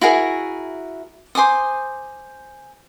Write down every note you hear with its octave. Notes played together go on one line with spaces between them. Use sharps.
E4 F#4 G#4 A#4
C5 G#5 D6 D#6